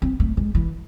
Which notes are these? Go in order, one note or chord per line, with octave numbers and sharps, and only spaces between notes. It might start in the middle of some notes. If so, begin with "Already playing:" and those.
C4
A3
G#3
E3